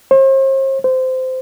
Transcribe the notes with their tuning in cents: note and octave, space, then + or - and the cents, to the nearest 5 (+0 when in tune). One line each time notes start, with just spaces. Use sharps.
C5 +40
C5 -20